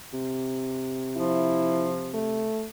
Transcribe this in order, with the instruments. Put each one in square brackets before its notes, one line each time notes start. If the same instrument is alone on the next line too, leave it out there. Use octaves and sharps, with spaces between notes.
[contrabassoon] C3
[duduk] F3 [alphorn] E4
[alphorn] A3